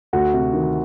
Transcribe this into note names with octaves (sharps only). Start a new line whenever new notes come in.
D2 F#4
C3
D#3